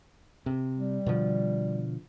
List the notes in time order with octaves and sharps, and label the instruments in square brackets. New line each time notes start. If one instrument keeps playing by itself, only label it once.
[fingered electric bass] C3
[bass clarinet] G3
[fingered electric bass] B2 D3 F3